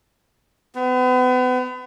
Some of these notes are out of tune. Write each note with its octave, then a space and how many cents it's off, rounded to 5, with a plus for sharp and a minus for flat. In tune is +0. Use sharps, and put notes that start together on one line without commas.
B3 +35